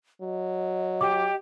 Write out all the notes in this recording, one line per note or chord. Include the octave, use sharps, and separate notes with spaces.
F#3 D#5
G4 D6